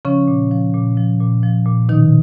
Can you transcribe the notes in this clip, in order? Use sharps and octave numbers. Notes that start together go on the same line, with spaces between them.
C#3 F3 C#4
A#2
F3
A#2
F3
A#2
F3
A#2
B2 D#3 D#4